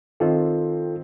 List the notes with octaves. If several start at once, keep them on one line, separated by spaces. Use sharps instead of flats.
D#3 C4 F4 A4